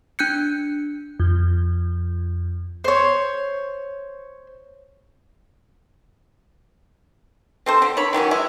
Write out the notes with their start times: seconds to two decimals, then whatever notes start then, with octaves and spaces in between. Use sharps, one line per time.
0.19 D4 F#6 G6 C#7
1.20 F2
2.84 C5 C#5
7.66 C4 A4 C5
7.82 D3
7.97 C#5 B5
8.13 D#3 E3 F#3 C#4
8.31 G#3 E4